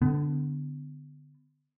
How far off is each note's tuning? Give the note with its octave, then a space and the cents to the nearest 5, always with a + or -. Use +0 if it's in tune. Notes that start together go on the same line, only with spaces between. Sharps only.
D3 +0 B3 +25